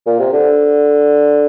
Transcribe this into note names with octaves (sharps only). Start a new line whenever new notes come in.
A#2
C3
D3